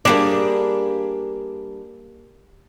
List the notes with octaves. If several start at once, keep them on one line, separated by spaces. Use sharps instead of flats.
G3 A#3 D4 G#4 G#5